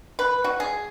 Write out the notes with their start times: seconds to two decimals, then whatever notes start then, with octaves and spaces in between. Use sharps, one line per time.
0.19 B4
0.44 F#4
0.60 G#4